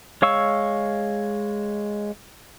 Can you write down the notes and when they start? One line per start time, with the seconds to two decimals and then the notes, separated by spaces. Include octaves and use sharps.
0.22 G#3 C#5 F5 C#6 E6